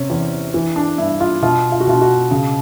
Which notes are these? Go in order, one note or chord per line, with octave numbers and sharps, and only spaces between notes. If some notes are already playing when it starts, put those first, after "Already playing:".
Already playing: C3 C#4
E2
E3
D4
G2 E4
F4
B2 F4
F4
F#4
B2 F4
F#4
C#3